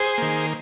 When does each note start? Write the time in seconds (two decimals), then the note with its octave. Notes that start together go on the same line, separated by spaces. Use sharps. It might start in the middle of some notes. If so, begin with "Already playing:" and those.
Already playing: G#4 C5
0.18 D#3 A#3